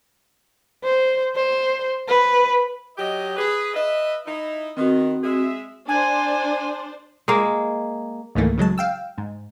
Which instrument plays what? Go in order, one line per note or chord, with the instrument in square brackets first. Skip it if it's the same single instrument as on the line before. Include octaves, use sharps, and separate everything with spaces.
[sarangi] C5
C5
B4
[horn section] F#3 G4 D#5
G#4 B4
B4 D#5 E5
D#4 E4
[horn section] D#3 B3 [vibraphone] C4 F#4
[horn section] G#3 G#4 E5
[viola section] D4 C5 [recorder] G#5
[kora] G#3 A#3
[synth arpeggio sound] C#2 G#2 D#3 E3 A3 A#3
C#3 F#3 G#3 A5
F5 G5 E6
G#2